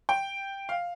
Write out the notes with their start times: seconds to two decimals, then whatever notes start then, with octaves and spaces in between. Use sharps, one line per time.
0.09 G5
0.69 F5